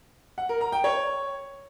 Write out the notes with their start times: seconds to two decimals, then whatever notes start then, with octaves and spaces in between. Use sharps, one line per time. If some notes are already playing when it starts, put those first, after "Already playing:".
0.38 F#5
0.49 A#4
0.61 A#5
0.72 G5
0.84 C#5